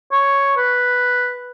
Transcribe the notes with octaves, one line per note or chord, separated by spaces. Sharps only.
C#5
B4